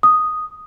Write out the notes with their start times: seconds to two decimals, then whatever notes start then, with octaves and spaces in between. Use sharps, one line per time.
0.03 D#6